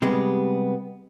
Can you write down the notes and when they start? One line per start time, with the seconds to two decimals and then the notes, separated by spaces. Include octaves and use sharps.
0.02 C3 G3 G#3 B3